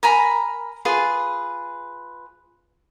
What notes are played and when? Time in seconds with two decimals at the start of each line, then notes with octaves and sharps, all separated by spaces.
0.03 A#4 G#5 A#5 B5
0.85 F4 G#4 B4